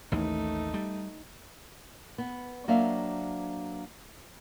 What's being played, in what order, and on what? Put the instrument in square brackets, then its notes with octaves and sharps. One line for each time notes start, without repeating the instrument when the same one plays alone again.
[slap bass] A1 D#2 E3 [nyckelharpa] A3 D#4
[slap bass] G3
[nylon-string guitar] B3
F#3 A#3 D4 C5 E5 F5